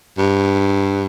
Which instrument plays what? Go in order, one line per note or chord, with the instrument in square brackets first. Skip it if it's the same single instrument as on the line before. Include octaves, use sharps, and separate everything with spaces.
[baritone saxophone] G2